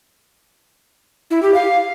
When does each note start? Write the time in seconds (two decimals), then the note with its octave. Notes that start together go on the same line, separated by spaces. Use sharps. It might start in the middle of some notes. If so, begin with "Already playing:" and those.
1.31 E4
1.42 G4
1.54 F5